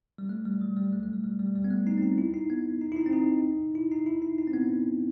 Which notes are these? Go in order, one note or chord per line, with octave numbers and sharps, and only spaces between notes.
G3
A3
G3
F#3
G3
A3
A3
G3
G3
G3
G3
B3
A3
D#4
C4
D#4
E4
D#4
B3
D#4
E4
D#4
C4
D#4
E4
D#4
E4
D#4
D#4
C4
B3